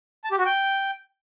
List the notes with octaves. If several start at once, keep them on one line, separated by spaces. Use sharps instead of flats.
A5
G4
F#4
G5